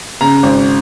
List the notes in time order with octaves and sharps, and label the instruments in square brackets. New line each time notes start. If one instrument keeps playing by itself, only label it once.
[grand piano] C#3 A#5
G#1